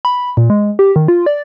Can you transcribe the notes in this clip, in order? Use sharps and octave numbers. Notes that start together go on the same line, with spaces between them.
B5
A#2
G#3
G4
D#3
F4
D5